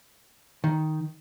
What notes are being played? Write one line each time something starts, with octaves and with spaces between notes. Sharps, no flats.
D#3